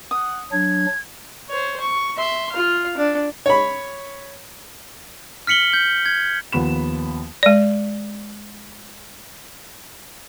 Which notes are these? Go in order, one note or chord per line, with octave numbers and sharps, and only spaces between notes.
F#5 D#6
F#3 D4 G#6
C5 C#5
C#6
E5 C6
F4 F5
D4
C#5 B5
F6 B6 C#7 F#7 G7
G6
G#6
D#2 F3 B3 B5 E7
G#3 D5